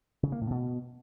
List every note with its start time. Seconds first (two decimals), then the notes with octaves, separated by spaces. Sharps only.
0.23 C#3
0.32 A#3
0.41 A2
0.50 B2